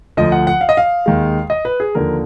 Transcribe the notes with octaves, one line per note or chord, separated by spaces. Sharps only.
D2 D3 F3 D#5
F#5
F#5
F5
D#5
F5
D#2 D#3 G#3
D#5
B4
G#4
D#2 D3 F3 A#4